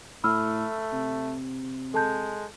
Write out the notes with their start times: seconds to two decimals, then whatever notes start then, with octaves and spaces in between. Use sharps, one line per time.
0.24 A2 A3 B5 E6 F6
0.93 C3
1.94 G#3 A4 A5 G6